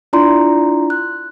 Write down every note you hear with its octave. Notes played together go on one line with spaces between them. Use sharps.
D4 E4 F4 D5 A#5 C6
F#6